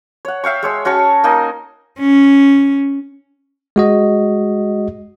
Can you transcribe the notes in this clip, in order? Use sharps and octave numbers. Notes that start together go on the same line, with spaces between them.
C#5 F#5
E5 F5 G5 C#6
G#3 C#5 E6
C#4 F#4 A5 C#6
A#3 D#4 D#5 G#5
C#4
G#3 F#4 D#5